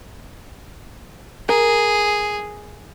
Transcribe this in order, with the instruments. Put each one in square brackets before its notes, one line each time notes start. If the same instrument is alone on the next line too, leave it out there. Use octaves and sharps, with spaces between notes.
[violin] G#4 [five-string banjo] A#4